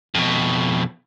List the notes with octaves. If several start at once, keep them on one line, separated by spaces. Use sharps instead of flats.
F2 B2